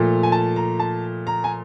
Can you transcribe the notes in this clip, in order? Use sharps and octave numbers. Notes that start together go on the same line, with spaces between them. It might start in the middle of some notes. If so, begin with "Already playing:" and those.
Already playing: A#2 F3 A3
G#5
A5
A#5
A5
A#5
G#5